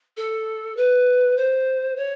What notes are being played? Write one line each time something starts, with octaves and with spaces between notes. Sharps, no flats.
A4
B4
C5
C#5